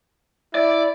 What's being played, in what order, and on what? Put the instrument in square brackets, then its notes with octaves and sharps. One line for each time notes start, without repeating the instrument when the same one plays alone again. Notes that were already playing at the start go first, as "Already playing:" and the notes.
[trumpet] E4 [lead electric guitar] D5